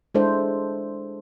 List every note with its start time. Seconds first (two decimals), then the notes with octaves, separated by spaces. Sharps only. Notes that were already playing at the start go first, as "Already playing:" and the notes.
0.14 G#3 D4 E4 A4 C5